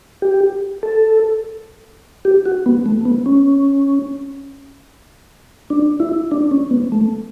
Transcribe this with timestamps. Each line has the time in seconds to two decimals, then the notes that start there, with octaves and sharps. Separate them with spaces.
0.22 G4
0.83 A4
2.25 G4
2.45 F#4
2.66 B3
2.86 A3
3.05 B3
3.26 C#4
5.70 D4
6.00 E4
6.31 D4
6.51 C#4
6.71 B3
6.92 A3